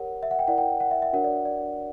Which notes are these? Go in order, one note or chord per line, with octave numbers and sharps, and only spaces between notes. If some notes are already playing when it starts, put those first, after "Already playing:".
Already playing: G4 A#4 C#5 F#5
E5
F#5
G5
E4 A#4 D5 F#5
G5
F#5
E5
E5
D4 F#4 A#4 C#5 F#5
D5
D5